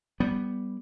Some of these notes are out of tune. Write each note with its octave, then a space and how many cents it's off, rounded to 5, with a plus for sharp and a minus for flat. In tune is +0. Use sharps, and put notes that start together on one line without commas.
G3 +0 B3 +0